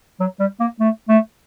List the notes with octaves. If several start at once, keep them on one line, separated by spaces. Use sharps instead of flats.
F#3
G3
A#3
A3
A3